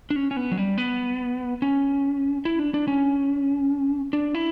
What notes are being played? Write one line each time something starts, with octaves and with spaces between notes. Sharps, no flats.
D4
C#4
C#4
B3
F#3
G3
B3
C#4
E4
D4
D4
C#4
D4
E4